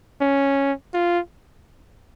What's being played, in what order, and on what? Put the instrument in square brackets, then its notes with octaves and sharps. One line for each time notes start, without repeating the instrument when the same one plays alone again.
[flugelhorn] C#4
F4